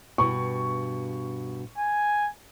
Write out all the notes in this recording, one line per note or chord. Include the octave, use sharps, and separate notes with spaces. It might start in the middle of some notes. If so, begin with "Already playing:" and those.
G2 B2 C#6
G#5